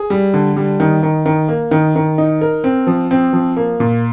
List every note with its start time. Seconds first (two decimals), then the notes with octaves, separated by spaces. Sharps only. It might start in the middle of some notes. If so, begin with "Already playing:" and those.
Already playing: G#4
0.10 G3
0.34 D3
0.57 G3
0.80 D#3
1.03 D#3
1.26 D#3
1.48 A#3
1.71 D#3
1.96 D#3
2.18 D#4
2.41 A#4
2.64 C4
2.87 F3
3.11 C4
3.33 F3
3.57 A#3
3.80 A#2